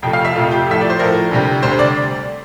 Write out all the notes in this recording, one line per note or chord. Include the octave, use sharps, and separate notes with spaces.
F2 C3 F3 A3 G5
F5
E5
F2 C3 F3 A3 F4
G4
A2 F3 A3 E5
D5
C5
A2 F3 A3 A#4
D2 C3 G3
D2 C3 G3 C5
D5